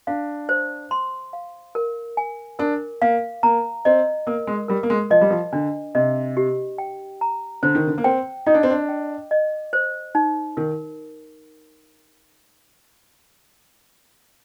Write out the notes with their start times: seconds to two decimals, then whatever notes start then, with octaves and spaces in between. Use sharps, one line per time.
0.07 D4 F5
0.49 C5
0.91 C6
1.33 F5
1.75 A#4
2.17 G#5
2.59 D4 A#4
3.02 A#3 F5
3.43 A#3 A#5
3.85 C4 D#5
4.27 A#3 A#4
4.47 G#3
4.68 G3 A#4
4.83 A#3
4.90 G#3
5.10 F3 D#5
5.21 G3
5.30 F3
5.52 D3 D4
5.95 C3 D#5
6.37 G4
6.78 G5
7.21 A#5
7.63 D3 C5
7.75 D#3
7.87 D3
7.98 A#3
8.04 C4 G5
8.46 D#4 D#5
8.54 D4
8.63 C4
8.70 D4
8.89 G5
9.31 D#5
9.73 C5
10.15 D#4
10.57 D#3 A#4